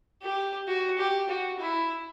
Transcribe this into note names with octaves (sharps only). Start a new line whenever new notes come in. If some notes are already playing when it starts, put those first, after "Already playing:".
G4
F#4
G4
F#4
E4